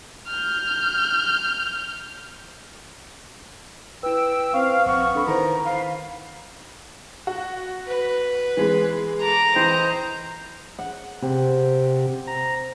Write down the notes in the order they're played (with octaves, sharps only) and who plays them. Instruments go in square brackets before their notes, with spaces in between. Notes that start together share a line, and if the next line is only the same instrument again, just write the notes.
[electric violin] F6 G6
[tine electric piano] E4 B4 [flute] G5 [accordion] E6
[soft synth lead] C4 [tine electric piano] B4 C#6 [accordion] F5
[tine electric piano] A#1 F5 F6 [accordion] B3 [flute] C#6
[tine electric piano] D4 A4 B5
[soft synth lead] D#3 [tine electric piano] E4 A#4 C5 [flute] A#5
[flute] F5 [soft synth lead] B5
[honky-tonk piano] F#4
[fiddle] B4
[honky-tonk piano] E3 G#3 B3
[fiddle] A4 D6 [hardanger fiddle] A#5
[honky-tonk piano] E3 G5 B5 [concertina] C5 [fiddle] D#5
[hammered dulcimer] F#5
[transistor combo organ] C3 [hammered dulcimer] C4
[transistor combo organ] A#5